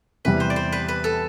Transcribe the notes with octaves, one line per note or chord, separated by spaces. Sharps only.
E2 C3 G3 B4
C5
D5
C5
B4
B4
A4